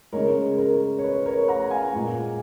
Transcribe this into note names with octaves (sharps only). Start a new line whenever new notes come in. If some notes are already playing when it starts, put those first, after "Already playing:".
C#3 G#3 A#4 C#5
A#4
C#5
B4
A#4 C#5
F#5 A#5
F5 G#5
A#2 G#3